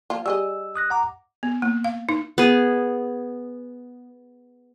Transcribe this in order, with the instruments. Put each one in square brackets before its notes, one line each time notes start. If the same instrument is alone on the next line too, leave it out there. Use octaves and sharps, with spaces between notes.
[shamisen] F3 A#3 F4
[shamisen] G3 G#4 D#5 [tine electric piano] E6
[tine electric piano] D#6 F#6 A#6
F#5 A#5 D6
[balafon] B3
A#3
F5
D#4
[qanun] B3 G#4